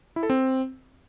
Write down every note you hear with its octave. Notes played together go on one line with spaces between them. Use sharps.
E4
A4
C4